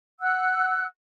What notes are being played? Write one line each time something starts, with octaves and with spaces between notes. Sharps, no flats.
F#5 E6 F#6